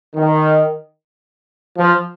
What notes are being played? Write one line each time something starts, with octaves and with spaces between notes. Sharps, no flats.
D#3
F3